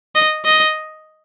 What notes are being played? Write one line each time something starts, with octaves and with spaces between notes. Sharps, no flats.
D#5
D#5